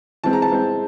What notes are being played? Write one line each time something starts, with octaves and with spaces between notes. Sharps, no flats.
E3 G#3 C4 A5
A#5
A5
E3 G#3 C4